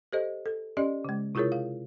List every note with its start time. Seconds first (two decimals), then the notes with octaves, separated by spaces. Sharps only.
0.12 G4 A4 C5 D#5
0.46 A4
0.77 C#4 G4 D5 D#5
1.05 C#3 G#3
1.35 C3 E4 F4 G#4 A#4 C#5
1.52 F5